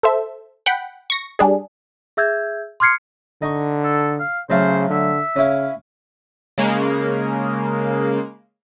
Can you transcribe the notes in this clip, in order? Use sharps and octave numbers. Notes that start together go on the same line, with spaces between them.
A4 C5 E5
F#5 G5 B5
C#6 A#6
G3 D4 G#4
G#4 E5 E6 G6 G#6
C6 D6 F6 G#6 C7 C#7
D3 D#4 C#6
A4
F5
C#3 F#3 A3 C5 F5
D3 E5
C#3 C#4 E4 F5
C#3 G#3 A#3